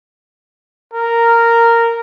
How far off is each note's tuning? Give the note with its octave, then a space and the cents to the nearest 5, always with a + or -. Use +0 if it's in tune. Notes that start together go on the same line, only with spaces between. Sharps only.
A#4 -10